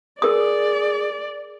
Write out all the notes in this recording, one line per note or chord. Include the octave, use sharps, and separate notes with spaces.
G#4 A#4 D5 D#6